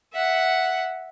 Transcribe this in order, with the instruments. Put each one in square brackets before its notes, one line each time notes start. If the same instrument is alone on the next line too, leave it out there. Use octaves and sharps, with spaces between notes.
[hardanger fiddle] E5 F#5